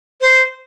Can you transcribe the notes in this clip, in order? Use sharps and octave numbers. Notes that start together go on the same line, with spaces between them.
C5